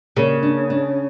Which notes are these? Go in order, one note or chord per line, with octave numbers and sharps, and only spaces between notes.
C#3 A#3
D4
D4